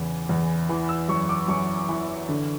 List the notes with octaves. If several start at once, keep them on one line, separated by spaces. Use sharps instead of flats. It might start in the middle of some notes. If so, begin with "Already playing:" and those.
Already playing: E2 C#3 E3
E2
E3
E6
F#2 C#6
D6
F#2 C#6
E3
D3